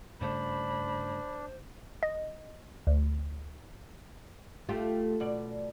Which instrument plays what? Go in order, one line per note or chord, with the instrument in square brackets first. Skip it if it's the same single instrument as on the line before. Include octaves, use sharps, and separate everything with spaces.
[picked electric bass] G2 C#3 A3 [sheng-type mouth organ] D4 [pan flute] C5 [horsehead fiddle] B5
[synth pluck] D#5
D2
[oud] A3 F4 G4
B2 D5